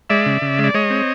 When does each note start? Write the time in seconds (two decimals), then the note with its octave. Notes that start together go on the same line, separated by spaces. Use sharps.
0.10 G#3 D5 E5
0.26 C#3
0.42 C#3
0.58 G#3
0.64 D5
0.74 G#3 C#5 D#5
0.90 C4